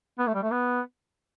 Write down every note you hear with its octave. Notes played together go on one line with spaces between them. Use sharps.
B3
A3
G3
A3
B3